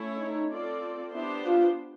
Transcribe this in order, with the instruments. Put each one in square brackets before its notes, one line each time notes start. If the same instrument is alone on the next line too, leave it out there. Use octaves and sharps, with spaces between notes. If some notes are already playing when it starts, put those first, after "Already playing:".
Already playing: [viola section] A3 C#4 E4 A4 C#5
[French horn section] D#4
[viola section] C4 F4 A4 D5
[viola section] B3 D4 G4 C5 [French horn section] E4
[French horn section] F4